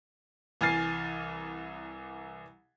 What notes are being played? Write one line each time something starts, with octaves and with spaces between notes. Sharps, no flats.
C2 E3 G#5 F6 A6 C7